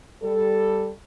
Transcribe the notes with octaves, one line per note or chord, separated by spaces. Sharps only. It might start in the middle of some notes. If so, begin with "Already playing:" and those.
G3 A4